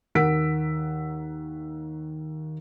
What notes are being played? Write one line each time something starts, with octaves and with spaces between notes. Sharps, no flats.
D#2 A#4 F#5 E6 B6 D7